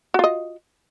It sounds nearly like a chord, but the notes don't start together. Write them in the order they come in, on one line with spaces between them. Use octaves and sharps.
F#4 F4 D#5